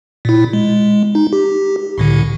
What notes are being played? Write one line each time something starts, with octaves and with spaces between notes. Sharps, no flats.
A#2 E4
G#3
D#4
G4
C2 A2 D3